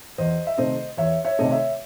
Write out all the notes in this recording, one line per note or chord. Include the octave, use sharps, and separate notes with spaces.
E2 C5 D#5
E5
C3 D#3 A3 C4 C5 D#5
E2 C#5 E5
C#5 E5
C3 D#3 A3 C4 D#5
C#5 E5